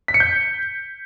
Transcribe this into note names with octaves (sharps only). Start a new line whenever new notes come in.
B6
C#7
G6